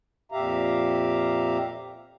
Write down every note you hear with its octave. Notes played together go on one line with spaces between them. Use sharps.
F2 A#2 G4 E5 F5 A#5